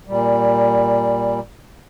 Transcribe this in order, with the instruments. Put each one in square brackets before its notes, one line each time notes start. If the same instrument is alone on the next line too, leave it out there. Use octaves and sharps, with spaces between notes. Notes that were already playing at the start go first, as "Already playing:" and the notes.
[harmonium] A#2 G3